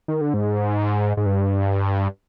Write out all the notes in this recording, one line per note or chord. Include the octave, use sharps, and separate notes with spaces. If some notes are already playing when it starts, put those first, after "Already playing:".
D#3
D3
G#2
G#2
G2